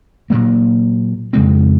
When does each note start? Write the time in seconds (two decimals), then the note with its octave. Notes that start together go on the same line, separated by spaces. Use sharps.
0.30 A#2 F#3 A#3
1.33 F2 C#3 G#3 C4